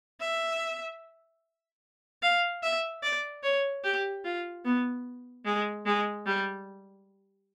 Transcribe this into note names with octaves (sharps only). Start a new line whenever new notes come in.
E5
F5
E5
D5
C#5
G4
F4
B3
G#3
G#3
G3